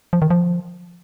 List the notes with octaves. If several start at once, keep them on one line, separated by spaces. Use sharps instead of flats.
F3
D#3
F3